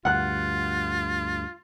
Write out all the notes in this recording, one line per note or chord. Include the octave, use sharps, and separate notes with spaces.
D2 G2 F4 F#5 F#6